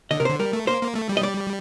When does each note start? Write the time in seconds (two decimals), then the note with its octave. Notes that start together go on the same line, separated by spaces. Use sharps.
0.11 D3 D#5
0.20 C3 A#4
0.25 D3 C5
0.39 G3 A#4
0.53 A3
0.67 A#3 C5
0.81 A#3
0.95 A3
1.09 G3
1.17 D#5
1.23 D5